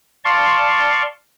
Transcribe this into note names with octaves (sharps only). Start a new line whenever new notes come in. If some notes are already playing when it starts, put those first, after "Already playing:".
D5 F5 A5 C6 C#6